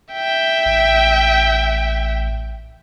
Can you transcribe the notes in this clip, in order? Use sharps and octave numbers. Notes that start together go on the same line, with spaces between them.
E5 G5
A1